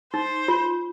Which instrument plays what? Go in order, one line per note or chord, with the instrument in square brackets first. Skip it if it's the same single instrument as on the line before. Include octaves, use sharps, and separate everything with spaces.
[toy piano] D#4 [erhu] C5
[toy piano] F4